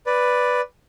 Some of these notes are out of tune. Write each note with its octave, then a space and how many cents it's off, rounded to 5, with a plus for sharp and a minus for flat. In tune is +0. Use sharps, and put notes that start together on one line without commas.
B4 +0 D5 +0